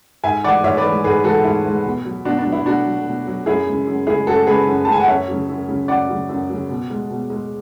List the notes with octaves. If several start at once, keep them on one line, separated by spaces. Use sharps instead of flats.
G#2 E5 G#5
E3 G#3 D5 F#5
G#2 C#5 E5
B4 D5
E3 G#3
G#2 G#4 B4
E3 G#3 F#4 A4
G#2 E4
E3 G#3
B2
F#3
B2 D4 F#4
D4
F#3
E4
B2 D4 F#4
F#3
B2
F#3
F#2 E4 G#4
C#3 G#3
F#2
C#3 G#3 E4 G#4
F#2 F#4 A4
C#3 G#3 G#4 B4
F#2
A5
C#3 G#3 G#5
F#5
F#2 C#5 E5
C#3 F#3
F#2
C#3 F#3
F#2 D5 F#5
C#3 F#3
F#2
C#3 F#3
B2
G#3
B2
G#3